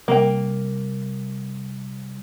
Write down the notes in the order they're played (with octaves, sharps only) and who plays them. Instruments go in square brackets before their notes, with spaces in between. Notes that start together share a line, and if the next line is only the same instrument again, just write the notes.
[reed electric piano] C3 G3 [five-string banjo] A#3 G5